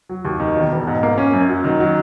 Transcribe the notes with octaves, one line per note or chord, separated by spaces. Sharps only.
F#3
D#2
D#3
E1
E1
G#2
A#3
C#4
F#2
F#3
D#3
F#3